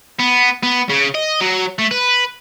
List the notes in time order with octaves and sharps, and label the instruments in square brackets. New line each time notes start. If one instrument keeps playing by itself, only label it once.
[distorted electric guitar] B3
B3
C#3
D#5
F#3
A3
B4